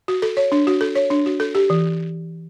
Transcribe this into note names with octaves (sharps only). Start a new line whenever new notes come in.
F#4
A4
C#5
D4
F#4
A4
C#5
D4
F#4
A4
G4
E3